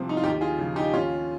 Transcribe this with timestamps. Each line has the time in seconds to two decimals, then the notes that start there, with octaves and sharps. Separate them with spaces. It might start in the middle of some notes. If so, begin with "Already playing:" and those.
Already playing: C2 C3 F3 C4
0.09 D#4
0.17 F4
0.23 D#2 D#4 G4
0.41 F4 G#4
0.58 C#3 F3
0.76 D#4 G4
0.93 D#2 C#4 F4